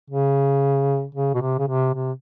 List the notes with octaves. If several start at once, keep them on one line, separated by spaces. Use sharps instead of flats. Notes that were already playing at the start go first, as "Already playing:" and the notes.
C#3
C#3
B2
C3
C#3
C3
C3